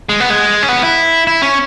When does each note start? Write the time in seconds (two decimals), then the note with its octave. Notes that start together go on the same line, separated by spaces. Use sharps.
0.09 G#3
0.20 B3
0.30 G#3
0.63 C#4
0.69 B3
0.83 E4
1.27 E4
1.42 C#4